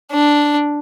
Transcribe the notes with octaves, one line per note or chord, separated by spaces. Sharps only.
D4